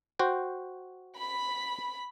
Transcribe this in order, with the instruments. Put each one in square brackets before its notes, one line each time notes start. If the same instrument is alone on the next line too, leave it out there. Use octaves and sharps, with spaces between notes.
[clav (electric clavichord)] F#4 C5 G5
[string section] B5